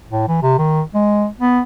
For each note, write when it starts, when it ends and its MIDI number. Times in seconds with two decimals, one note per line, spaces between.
0.10 0.26 45
0.28 0.39 52
0.42 0.55 48
0.58 0.81 51
0.94 1.26 56
1.39 1.61 59